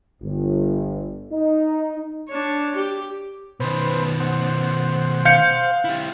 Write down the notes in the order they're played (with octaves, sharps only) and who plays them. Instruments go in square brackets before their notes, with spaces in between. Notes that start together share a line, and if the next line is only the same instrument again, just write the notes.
[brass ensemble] G1
D#4
[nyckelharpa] D4 C#5
G4
[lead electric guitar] B2 D#3 [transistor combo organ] B4 C5
[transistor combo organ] C5 F#5
[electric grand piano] F5 G6 C#7
[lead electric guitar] E4 G4